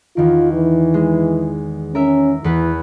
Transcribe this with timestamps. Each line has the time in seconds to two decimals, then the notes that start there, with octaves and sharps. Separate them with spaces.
0.17 E2 D#3 F4
0.53 E3
0.94 G#3
1.95 C#4 A#4 E5
2.44 E2 E3 B3 B4